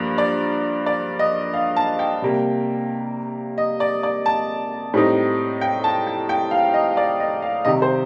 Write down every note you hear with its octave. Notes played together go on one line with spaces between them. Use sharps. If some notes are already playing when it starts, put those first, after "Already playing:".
Already playing: G2 F3 A#3 D5
D5
D5
D#5
F5
A5
G5
C3 G3 A#3
D#5
D5
D5
A5
A2 G3 C4 D#4
G5
A5
G5
G5
F5
D#5
D5
D#5
F5
C3 D#3 G3 D#5
C5